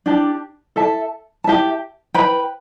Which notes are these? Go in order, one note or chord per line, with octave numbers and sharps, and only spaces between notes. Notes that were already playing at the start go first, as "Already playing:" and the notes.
D4 G4 D5 A5
A4 E5 A5
G4 E5 A5
B4 G5 B5